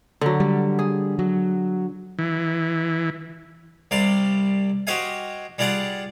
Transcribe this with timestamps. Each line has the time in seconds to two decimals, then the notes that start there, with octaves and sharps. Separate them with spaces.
0.21 D3 F#3
0.40 G3
0.79 G#4
1.19 F#3
2.19 E3
3.91 C2 C3 G3 F5 C6
4.87 F#4 G4 C5 D#5 F5 G#5
5.58 G3 F4 G#4 D5 F#5